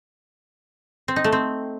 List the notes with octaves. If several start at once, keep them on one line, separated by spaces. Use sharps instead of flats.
C4
D#4
A3
C4